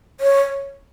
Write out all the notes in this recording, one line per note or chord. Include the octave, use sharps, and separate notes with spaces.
C#5